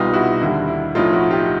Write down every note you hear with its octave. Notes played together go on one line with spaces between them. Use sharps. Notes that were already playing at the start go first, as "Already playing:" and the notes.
Already playing: C2 B2 G3 D#4 F4
E4 F#4
D#2 D3 G3 E4
E4
B1 A2 F3 A3 D#4 F4
E4 F#4
F4 G4